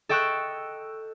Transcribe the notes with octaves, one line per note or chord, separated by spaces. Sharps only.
A4 D#5 G5 C#6 E6 F#6